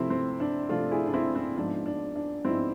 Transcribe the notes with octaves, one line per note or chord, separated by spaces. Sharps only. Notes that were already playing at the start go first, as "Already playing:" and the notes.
Already playing: C3 F3 A3 C4 E4
C4
D4
C3 F3 A3 D4 F4
E4 G#4
D4
C4 E4
C4
G#2 F3 G#3 B3 D4
D4
D4
G#2 F3 G#3 B3 C4 E4